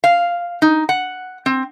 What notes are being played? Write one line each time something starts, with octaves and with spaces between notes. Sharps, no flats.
F5
D#4
F#5
C4